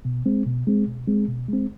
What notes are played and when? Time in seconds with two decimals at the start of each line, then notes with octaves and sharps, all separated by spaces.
0.05 B2
0.26 G#3 C4
0.46 B2
0.67 G#3 C4
0.87 B2
1.08 G#3 C4
1.28 B2
1.48 G#3 C4